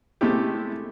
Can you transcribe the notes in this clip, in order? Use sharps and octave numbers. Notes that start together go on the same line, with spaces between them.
C3 G#3 A3 E4 G4